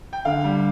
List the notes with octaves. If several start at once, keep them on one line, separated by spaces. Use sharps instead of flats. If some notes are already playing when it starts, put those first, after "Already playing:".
G5
D3 F5
G3